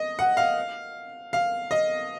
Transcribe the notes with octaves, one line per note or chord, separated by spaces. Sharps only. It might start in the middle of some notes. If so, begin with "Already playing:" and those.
Already playing: D#5
F#5
F5
F5
D#5